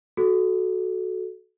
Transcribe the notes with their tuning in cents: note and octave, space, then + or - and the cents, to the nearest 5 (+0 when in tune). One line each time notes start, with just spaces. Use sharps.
F#4 +0 A4 -20